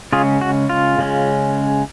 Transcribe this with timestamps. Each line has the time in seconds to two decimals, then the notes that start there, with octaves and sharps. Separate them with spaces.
0.12 C#3 G#3 C#4 F4 G#4
0.41 F#4
0.69 F4
0.98 C#3 G#3 C#4